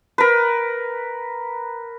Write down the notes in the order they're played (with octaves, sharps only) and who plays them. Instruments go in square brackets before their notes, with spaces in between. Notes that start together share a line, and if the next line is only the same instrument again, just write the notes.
[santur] A#4 B4